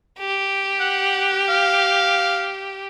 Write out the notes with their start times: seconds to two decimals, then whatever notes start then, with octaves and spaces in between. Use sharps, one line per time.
0.19 G4
0.80 F#5
1.49 F5